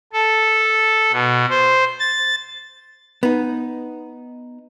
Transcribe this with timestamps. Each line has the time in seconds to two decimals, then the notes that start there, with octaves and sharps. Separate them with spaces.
0.13 A4
1.12 B2
1.49 C5
1.99 A6
3.23 B3 D#4